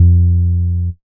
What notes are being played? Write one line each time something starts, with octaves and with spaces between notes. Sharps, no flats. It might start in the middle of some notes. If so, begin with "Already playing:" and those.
Already playing: F2